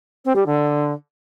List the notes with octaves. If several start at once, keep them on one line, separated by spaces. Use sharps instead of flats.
C4
G3
D3